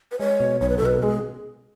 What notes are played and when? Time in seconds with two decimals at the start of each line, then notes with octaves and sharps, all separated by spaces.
0.12 B4
0.19 G#3 C#5
0.40 B2
0.61 B1 C#5
0.69 B4
0.78 A4
0.82 B2 B4
1.03 G#3 G#4